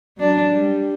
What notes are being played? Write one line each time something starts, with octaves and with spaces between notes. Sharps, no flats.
F#3 D4
G3